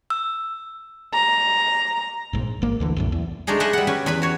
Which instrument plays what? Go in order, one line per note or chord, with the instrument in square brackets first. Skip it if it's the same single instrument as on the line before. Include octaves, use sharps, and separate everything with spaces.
[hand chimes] E6
[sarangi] A#5
[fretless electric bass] A#1 G#2
G#1 A#3
D2 D3 E3
B1 F#2 A2
E2
[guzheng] G#3 A3 D4 D#4 G#4
G#4 B4 D#5 E5 F#5
G3 F#5
C#4 G4 B4 G#5
E2 B4 B5
F#4 C#5